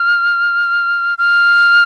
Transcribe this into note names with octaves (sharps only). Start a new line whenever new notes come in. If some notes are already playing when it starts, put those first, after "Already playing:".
Already playing: F6
F6